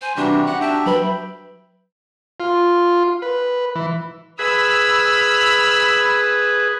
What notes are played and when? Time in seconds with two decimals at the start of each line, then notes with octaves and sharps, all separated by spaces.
0.02 C5 G#5
0.17 C3 E3 G3 D4 F#4 G4 A#5
0.47 F#5 F#6
0.61 D4 E5 G5 A5
0.86 F#3 B4 B5
2.40 F4
3.22 B4
3.75 E3
4.39 G#4 B4 B5 E6 F6